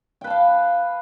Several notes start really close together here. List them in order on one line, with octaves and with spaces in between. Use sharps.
G5 B4 A5 F5